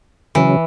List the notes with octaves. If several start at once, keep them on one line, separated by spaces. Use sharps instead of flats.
C#3 E3 F#3 C#4